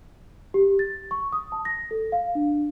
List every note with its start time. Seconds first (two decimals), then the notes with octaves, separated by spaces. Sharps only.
0.54 G4
0.79 A6
1.11 C#6
1.33 D#6
1.52 A5
1.65 A#6
1.91 A4
2.12 F5
2.35 D4